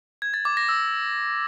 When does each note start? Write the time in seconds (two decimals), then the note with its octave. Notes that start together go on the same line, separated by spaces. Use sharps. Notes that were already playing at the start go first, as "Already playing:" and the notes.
0.22 G#6
0.34 A6
0.45 D6
0.57 A#6
0.69 E6